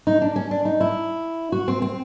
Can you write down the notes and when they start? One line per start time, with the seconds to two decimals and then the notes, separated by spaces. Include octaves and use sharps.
0.07 D#4
0.22 D4
0.36 C#4
0.51 D4
0.65 D#4
0.81 E4
1.52 F#4
1.68 C4
1.82 C4